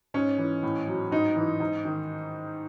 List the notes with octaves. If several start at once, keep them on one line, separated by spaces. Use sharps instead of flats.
G#2 C#4
E3
A2
F#3
G#2 D#4
E3
G#2
D#3